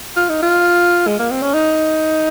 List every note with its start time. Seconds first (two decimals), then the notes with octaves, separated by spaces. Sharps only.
0.16 F4
0.29 D#4
0.42 F4
1.07 G#3
1.19 A#3
1.31 C4
1.42 C#4
1.54 D#4